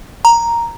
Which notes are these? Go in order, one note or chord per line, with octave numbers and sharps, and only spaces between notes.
A#5